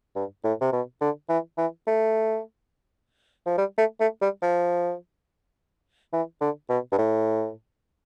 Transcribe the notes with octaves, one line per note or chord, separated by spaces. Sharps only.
G2
A2
C3
B2
D3
E3
E3
A3
F3
G3
A3
A3
G3
F3
E3
D3
B2
G2
A2